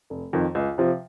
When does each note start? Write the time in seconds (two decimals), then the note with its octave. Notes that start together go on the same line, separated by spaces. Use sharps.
0.10 F1
0.33 F2 D#3
0.55 C#2
0.78 C3 F3